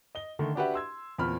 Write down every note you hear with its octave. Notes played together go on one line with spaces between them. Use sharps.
D#5 G7
D3 D#3 A3
D4 F#4 G4 B4 E5 F#5
C6 E6 G#6
E2 A#2 C4 B5 F6